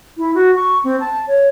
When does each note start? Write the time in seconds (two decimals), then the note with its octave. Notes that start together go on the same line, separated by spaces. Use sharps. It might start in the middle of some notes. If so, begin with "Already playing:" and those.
0.18 E4
0.35 F#4
0.55 C#6
0.84 C4
1.00 A5
1.28 C#5